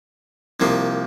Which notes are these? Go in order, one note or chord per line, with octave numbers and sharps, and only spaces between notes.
C2 C3 F3 A#3